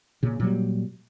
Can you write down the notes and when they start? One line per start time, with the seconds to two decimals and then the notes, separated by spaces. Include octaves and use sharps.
0.23 A#2 C#3
0.40 A#2 F#3 G3